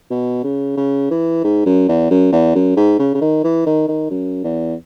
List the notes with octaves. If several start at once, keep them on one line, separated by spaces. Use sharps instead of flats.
B2
C#3
C#3
E3
G#2
F#2
E2
F#2
E2
F#2
G#2
C#3
C#3
D#3
E3
D#3
D#3
F#2
E2